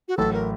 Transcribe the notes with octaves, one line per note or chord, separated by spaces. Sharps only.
F#4
A1 A2 F#3 A3 A4
A#4